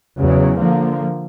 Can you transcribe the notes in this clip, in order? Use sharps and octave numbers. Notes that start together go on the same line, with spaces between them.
E2 C#3 F#3
D3 F3 A#3